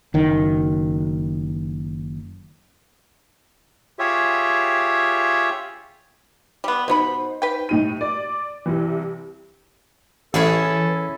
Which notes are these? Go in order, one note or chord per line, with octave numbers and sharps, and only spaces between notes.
F#1 D#3
F4 G4 G#4 C#5 E5
G3 B3
B2 B3 D#4 C5 B5
B4 G5
A2 D#4 D#7
D5
C2 C3 E3
A1 E3 C#4 E4 G#4 A4